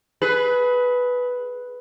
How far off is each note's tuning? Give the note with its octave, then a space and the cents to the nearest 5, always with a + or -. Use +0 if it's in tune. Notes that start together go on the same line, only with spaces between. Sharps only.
G#4 +30 B4 +0